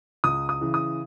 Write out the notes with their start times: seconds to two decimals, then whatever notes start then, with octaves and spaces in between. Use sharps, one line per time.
0.24 C#2 D#6
0.49 D#6
0.61 C#3 E3
0.74 D#6